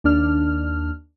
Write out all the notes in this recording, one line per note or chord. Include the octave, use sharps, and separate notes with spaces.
D#2 D4 F6